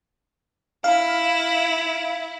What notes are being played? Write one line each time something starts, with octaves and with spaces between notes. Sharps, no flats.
E4 F5